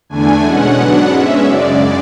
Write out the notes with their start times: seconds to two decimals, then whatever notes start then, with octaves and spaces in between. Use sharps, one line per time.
0.09 E2 D3 A3 D4 G#5
0.43 B2 G#3 C#4 F#5
0.77 G#2 F#3 B3 D4 F#5
1.11 G#2 G#3 C#4 E5
1.45 F#2 C#3 G#3 D5